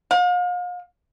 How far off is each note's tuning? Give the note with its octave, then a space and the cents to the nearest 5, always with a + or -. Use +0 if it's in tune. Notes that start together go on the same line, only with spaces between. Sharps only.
F5 +40